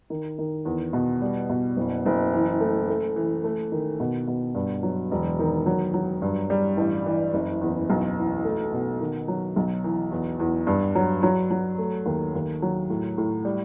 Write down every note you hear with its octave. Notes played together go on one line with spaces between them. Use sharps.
D#3
D#3
E2
B2
G3
B2
F#1
F#1
E3
A3
A3
E3
A3
D#3
B2
B2
G2
F#3
E1
D#3
F#3
F#3
G2
G3
A1
E3
F#1
E2
B1
E3
A3
B2
D#3
F#3
B1
E3
E2
E2
G2
F#3
F#3
F#3
A3
D#2
D#2
F#3
A2
A2
G3